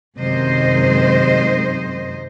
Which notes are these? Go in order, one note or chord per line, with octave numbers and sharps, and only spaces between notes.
F#2 C3 D#3 G#3 C5 D#5